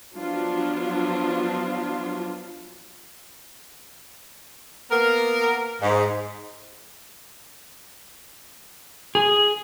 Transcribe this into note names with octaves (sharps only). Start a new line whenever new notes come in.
F3 F#3 B3 D4 F4
A#3 B3 A#4
G#2
G#4